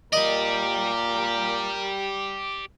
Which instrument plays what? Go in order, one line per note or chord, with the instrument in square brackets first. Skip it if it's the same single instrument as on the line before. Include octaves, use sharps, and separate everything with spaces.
[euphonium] A#2 [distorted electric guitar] G4 D5 [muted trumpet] A#4 [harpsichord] D#5 D#6